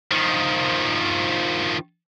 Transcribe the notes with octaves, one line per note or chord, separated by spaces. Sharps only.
D#3 F3